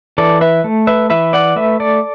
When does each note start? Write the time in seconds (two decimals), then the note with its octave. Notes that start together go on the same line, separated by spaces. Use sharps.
0.18 E3 A4 D5
0.41 B4 E5
0.64 A3
0.87 B4 E5
1.10 E3 B4 E5
1.33 D5 F#5
1.56 A3 B4 E5
1.80 A4 D5